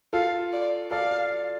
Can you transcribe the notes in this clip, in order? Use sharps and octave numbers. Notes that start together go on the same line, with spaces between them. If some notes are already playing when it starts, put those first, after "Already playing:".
F4 A4 F5
D5
A4 D5 F5